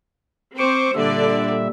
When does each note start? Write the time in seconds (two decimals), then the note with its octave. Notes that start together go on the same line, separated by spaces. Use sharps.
0.58 C4 C5 C#6 D6
0.95 A#2 D3 G3 D5 E5